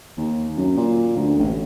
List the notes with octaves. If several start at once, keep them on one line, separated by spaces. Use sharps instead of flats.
D#2
F#2
A#2
D2
A1